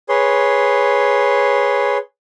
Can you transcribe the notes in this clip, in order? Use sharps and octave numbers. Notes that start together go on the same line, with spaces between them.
G#4 B4 C#5 C6